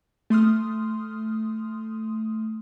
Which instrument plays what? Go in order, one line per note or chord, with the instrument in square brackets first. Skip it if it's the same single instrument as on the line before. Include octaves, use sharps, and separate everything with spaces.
[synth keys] A3 C6 D#6 F6